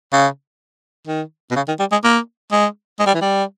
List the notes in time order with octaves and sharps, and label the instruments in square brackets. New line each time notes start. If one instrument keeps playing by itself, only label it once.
[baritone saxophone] C#3
D#3
B2
C#3
D#3
G3
G#3
A#3
G#3
G#3
G3
E3
G3